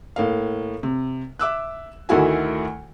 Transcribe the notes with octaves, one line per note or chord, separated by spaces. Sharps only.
A2 A#3 F5
C3
E5 D6 E6 F#6
D2 D#3 A3 E4 F#4 G#5